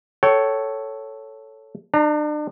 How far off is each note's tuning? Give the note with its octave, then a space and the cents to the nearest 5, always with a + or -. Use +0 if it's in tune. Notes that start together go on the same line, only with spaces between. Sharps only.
A4 +0 C#5 +0 G5 -35
D4 +35 A#5 -5